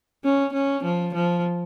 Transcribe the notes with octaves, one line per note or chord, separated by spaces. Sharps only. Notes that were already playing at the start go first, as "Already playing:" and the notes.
C#4
C#4
F3
F3